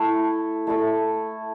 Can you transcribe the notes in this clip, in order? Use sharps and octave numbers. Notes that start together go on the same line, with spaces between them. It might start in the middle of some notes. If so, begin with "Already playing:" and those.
Already playing: A3 E4 A4
A3 E4 A4